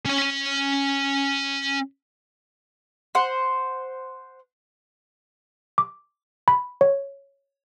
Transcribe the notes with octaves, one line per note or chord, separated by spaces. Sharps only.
C#4 G#5
C5 F#5
D6
B5
C#5